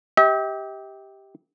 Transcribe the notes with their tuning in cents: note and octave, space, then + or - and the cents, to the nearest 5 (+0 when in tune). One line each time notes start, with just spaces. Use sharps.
G4 +0 E5 -45